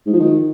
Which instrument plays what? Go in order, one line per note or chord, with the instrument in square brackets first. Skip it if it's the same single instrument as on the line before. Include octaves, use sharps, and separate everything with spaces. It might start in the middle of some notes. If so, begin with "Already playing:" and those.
[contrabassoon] G#2
F3
D#3